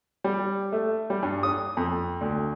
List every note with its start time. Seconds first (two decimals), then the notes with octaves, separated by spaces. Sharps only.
0.24 G3
0.72 A3
1.10 G3
1.23 G2
1.43 D#6
1.77 F2
2.21 D2